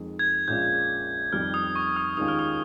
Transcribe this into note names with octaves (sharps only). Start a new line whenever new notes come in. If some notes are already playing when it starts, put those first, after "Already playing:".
Already playing: F2 D#3 G#3
G#6
A#1 A#2 G#3 C#4 F4 G6
F2 D#3 G3 F6
D#6
C#6
D#6
D#2 D#3 G#3 C#4 F4 D#6
F6
D#6